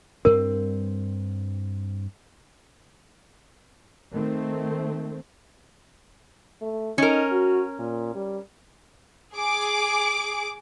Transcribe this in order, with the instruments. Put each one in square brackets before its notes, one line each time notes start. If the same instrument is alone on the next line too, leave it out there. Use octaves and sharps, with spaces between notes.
[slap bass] G2 C4 [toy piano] A#4
[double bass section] D#3 A3 C4
[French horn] A3
[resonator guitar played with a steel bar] C#4 A#4 [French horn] D#4
[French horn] F#4
A#2
G3
[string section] G#4 D6